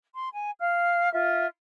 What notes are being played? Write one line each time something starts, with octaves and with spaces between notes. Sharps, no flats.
C6
G#5
F5 F6
F4 E5